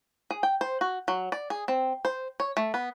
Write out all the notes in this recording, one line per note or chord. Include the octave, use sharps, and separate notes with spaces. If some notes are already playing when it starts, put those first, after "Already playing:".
G#4
G5
C5
F#4
F#3
D5
G#4
C4
C5
C#5
A3
B3